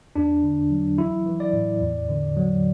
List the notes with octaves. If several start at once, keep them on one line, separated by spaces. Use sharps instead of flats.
E2 D4
D3
F#3
E3 E4
E3
D5
A2
E2
D3
F#3